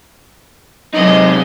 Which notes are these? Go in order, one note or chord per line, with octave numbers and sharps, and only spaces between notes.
C3 F#3 G#3 D#4 D#5